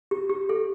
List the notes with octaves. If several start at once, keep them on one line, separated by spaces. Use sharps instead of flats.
G4
G4
A4